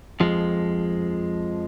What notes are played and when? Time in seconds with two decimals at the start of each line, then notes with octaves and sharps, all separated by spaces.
0.20 F2 F3 G#3